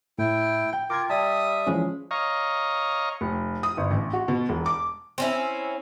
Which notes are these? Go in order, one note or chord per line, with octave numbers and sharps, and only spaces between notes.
A2 E4 G5
G5
F4 A#4 D6 G#6
G3 E5 A5 D#6
E3 F3 G#3 C#4
C#5 D#5 F5 A#5 C#6
F1
D#6
G1
A1
F#4
B2
E1
D6
C4 C#4 E4